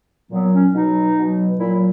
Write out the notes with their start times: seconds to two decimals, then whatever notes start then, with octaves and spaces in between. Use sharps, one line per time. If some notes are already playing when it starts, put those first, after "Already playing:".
0.31 A#2 F#3 B3
0.53 C#4
0.73 B2 F#3 D#4
1.16 B2 F#3
1.59 A#2 F#3 E4